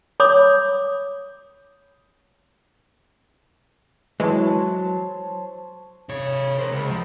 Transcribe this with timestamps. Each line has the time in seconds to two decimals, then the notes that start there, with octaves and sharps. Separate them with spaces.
0.20 C#5 B5 D6 D#6
4.20 E3 F#3 G#3 E4 C5 C#5 A5
6.09 C3 C#5
6.59 A#4 C5
6.71 C#2
6.91 F3